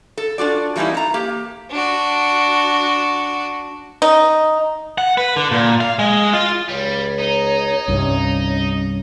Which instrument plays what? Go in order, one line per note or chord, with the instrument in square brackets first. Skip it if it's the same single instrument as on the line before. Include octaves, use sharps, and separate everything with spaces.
[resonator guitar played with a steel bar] A4
D4 F4 F#4 D5
E3 G3 A#3 C#4 D#4 E4
A3 A#5
A#3 G4
[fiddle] D4 F#4
[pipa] D#4
[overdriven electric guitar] F#5
B4
D3
A#2
F5
G#3
F4
[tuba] C#2 [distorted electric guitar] G3 [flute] C#5
[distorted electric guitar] D#4
[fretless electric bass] C2 G2 [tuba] C#4